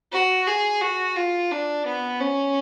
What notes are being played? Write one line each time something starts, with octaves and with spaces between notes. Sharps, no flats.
F#4
G#4
F#4
F4
D4
B3
C#4